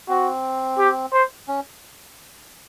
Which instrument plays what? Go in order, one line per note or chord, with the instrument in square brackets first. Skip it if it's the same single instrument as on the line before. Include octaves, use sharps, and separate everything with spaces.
[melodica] C4 [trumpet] F#4
[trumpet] G4
C5
[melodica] C#4